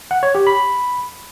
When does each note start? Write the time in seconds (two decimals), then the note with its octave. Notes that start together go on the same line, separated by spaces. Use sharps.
0.11 F#5
0.23 C#5
0.35 G4
0.47 B5